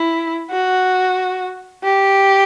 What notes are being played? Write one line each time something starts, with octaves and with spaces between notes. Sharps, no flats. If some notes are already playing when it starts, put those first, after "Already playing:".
Already playing: E4
F#4
G4